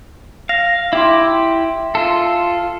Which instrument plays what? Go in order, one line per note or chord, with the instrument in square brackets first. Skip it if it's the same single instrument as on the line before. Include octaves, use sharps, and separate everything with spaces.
[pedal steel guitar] F5 [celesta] A#6
[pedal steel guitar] E4 G4 [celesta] E5 C6
[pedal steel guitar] F4 A4